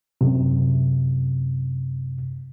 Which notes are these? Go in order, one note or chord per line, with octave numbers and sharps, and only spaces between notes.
F#2 C3